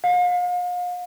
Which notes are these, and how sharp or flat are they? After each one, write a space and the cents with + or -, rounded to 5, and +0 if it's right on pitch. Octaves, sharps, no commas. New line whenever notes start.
F5 +40